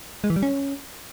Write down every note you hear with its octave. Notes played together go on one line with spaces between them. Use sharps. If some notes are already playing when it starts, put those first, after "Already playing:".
G#3
E3
G3
C#4